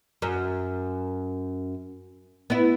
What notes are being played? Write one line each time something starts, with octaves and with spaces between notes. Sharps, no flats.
F#2
B3 E4